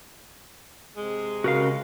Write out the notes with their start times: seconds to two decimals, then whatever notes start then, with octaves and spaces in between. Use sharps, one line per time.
0.97 C3 G#3
1.44 C#3 F#4 A#4 F5